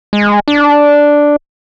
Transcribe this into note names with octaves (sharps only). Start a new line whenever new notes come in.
G#3
D4